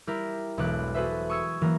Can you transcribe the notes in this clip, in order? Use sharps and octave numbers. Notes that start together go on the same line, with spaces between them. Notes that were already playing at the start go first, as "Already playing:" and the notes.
G3 E4 G4 A#4
E1 B1 G#3 B3 D6 F#6
F#4 G#4 A4 B4 C5 E5
C#6 D#6 E6 G#6 C#7
E3 F#3 A#3 A#4